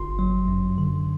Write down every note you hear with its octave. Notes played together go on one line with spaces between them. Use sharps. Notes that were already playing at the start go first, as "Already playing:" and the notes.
Already playing: G1 C6
F#3
F#2
D3